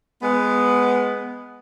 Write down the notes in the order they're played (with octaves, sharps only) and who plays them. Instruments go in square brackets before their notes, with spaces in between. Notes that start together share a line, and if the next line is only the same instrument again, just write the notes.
[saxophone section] G#3 B3